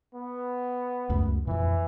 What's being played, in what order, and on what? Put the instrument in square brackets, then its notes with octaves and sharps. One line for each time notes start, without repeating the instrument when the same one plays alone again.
[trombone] B3
[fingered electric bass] C#2 F#2 A3
[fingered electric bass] F2 A#2 [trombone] E3